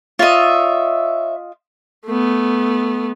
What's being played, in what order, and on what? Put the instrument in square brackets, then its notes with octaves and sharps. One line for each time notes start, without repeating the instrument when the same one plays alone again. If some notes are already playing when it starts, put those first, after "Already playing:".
[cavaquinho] F4 D#5 [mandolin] C#5 E5
[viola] A3 B3